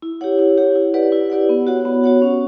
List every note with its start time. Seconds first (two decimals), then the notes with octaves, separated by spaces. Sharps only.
0.02 E4
0.21 G4 C#5 F#5
0.39 E4
0.58 G4 C#5 F#5
0.76 E4
0.94 G4 B4 D5 F#5
1.12 E4
1.30 G4 B4 D5 F#5
1.49 B3
1.67 F#4 C#5 F#5
1.85 B3
2.04 F#4 C#5 F#5
2.22 C#4